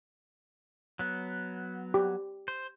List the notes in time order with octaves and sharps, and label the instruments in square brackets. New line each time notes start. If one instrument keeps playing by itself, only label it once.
[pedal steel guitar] F#3 B3
[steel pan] G4
[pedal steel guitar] C5